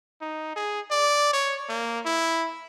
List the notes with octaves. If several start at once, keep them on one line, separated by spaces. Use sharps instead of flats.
D#4
G#4
D5
C#5
A#3
E4